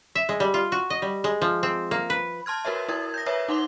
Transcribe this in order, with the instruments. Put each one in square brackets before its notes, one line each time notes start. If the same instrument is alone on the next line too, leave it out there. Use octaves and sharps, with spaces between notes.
[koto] E5
G#3
G3
F4
F#4
D#5
G3
G#3
F3
C4
A#3
B4
[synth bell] A5 C6 F6 G#6
F#4 A#4 B4 C#5 E5
E4 A#4 G#6
G6 A#6
B4 C#5 E5 D#6
D#4 F#5 C6 D6 G7